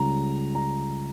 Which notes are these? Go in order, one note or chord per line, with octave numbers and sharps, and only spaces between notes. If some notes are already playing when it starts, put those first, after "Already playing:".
Already playing: C#2 C#3 G3 A#5
A#5